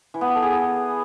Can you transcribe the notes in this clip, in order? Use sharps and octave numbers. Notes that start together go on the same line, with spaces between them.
E3
B3
G4
A4
G#4